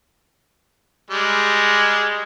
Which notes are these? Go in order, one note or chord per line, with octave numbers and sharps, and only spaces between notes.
G3 G#3